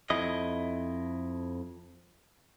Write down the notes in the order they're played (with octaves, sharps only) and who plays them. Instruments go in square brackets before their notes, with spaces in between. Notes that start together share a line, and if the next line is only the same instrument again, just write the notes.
[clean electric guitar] F2 E4 D#5